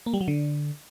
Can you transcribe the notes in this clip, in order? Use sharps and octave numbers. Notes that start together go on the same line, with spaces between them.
A#3
G3
F#3
D3